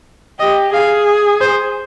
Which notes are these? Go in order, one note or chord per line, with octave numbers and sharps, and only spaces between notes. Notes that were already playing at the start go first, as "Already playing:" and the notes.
G4 D#5
G#4 F5
C5